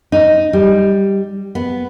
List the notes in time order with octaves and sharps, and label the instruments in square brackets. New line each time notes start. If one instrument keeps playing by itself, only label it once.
[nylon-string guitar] D#4
G3
B3